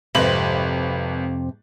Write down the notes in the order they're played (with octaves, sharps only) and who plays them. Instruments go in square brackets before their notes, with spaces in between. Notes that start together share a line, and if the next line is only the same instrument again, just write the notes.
[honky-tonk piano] G#1 B4 F#7 [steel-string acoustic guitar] F2 C3